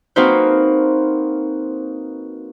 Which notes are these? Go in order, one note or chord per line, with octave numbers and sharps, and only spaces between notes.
A#3 C4 D#4 F#4 B4 C5